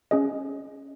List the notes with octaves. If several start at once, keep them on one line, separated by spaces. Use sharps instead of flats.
C#4 G#4 D#5